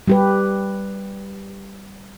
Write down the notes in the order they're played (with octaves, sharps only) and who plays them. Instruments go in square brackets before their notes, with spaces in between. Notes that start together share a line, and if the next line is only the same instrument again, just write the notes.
[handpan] G3 G4 B4